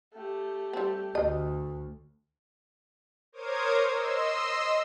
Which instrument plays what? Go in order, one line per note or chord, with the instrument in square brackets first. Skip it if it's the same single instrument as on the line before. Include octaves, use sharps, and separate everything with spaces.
[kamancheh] A3 G4
[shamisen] G3 C4
[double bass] D2 [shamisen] D#5
[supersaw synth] A#4 C5 C#5 D6 D#6 G#6
D#5 C6 E6